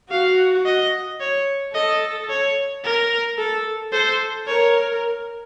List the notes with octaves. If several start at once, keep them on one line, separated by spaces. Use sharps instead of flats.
F#4 F5
D#5
C#5
A4 D#5
C#5
A#4
A4
A4 C5
A#4 C#5